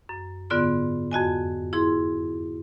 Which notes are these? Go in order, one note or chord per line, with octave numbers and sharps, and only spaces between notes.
F#2
G#2 D3 B3 F4 D5 C6
F2 F#4 D#5 G#5
E4 G#4 C6